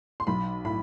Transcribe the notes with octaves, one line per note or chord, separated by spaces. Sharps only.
C6
B1 B5
A2 B5